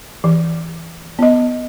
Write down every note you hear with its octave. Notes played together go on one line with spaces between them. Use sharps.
E3
B3 D#5